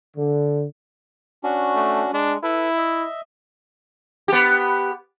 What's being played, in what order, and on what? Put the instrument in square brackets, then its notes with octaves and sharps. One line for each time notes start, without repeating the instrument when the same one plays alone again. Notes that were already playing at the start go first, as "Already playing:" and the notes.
[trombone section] D3
[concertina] C#4 D4 F#4
[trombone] A3
[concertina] G#3 [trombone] D4
[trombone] E4 [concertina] A4 B4
[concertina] D#5 E5
[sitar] B3 G4